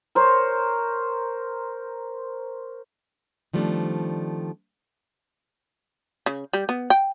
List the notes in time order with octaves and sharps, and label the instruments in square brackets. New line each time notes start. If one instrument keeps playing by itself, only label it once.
[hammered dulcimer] A#4 C5 C#5
[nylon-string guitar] D#3 F3 G3 A3 C4 D4
[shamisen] C#3
G3
B3
G5